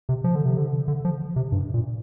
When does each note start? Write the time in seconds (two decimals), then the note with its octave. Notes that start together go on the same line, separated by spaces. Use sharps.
0.09 C3
0.24 F3
0.35 D3
0.45 C3
0.57 D3
0.88 D3
1.05 F3
1.36 C3
1.52 G2
1.74 A#2